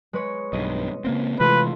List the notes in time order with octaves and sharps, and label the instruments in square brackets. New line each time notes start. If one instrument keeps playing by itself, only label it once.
[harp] G#3 B4 C#5
[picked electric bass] B1 G2 [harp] D#5
[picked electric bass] C#3 A#3 C4
[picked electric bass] C3 E3 G#3 [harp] A3 F4 B6 [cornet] B4